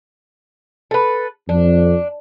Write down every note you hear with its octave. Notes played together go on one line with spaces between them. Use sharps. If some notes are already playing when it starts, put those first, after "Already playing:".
A4 B4
F2 D4